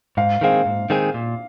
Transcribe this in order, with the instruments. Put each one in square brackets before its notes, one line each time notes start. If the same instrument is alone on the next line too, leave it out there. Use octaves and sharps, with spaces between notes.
[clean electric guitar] G#2 [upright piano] F5
[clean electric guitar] D#3 G#3 C4 G#4 [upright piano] F5
[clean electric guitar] G#2
D#3 G#3 C4 G#4
A#2